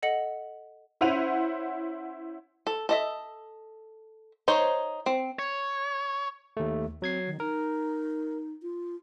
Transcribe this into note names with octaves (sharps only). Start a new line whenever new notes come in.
A4 D#5 F#5 C#7 F#7
C#4 E4 C5 F#5 D#7 F7
A4
A4 D#5 E5
D#4 C5 C#5
C4
C#5
D#2 A3
F#3 C4 G#6 C7
D#3
D#4 A#4
F4